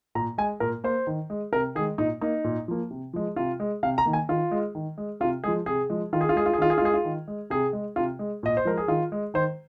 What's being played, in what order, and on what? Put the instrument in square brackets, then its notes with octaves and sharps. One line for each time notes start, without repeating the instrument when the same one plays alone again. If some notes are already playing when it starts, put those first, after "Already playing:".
[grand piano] A#2 A#5
G#3 G#5
A#2 A#4
A#3 C5
D#3
G#3
C3 A#4
D#3 G#4
G#3
A#2 D#4
A#3 D#4
A#2
F3 A#3
C3
F3 G#3
C3 F4
G#3
C3 F5
A#5
D#3 A#3
G#5
D#3 F4
G#3
D#3
G#3
C3 F4
F3 G#3 G#4
C3 G#4
F3 G#3
D#3 F4
G#4
F4
G#3 G#4
F4
G#4
D#3 F4
G#4
F4
G#3 G#4
F4
D#3
G#3
C3 G#4
G#3
C3 F4
G#3
A#2 D#5
C5
F3 G#3 A#4
G#4
D#3 F4
G#3
D#3 C5